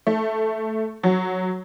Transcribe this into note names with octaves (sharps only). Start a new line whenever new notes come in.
A3
F#3